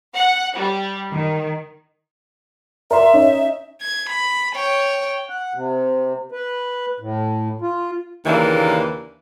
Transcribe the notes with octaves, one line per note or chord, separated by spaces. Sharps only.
F#5
G3
D#3
A#4 D5 E5 C6
C#4 D#4
G#6
B5
C#5 G5
F#5
C3
B4
A2
F4
D#2 C#3 E3 A#3 D4